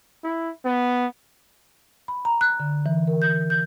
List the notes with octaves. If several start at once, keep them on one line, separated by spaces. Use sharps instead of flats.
E4
B3
B5
A#5
F#6
D3
E3
A#4
G6
G6